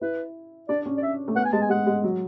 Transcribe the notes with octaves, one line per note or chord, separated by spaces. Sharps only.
E4 B4
D4 D5
C#4
D5
E5
A3
B3 F#5
G#5
G#3 A5
G#5
G#3 F#5
G#3
F#3